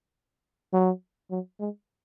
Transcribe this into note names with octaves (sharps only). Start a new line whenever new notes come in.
F#3
F#3
G#3